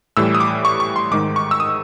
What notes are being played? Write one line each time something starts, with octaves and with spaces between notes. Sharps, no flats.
A2 E3 G3 E6
D#6
D6
C#6
C#6
C6
G#2 D#3 G#3 D6
C#6
E6
D#6